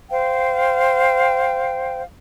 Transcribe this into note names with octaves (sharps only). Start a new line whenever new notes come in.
C5 F5 G5